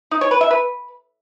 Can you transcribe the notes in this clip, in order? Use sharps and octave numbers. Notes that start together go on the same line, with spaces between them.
D#4
C#5
B4
E5
B4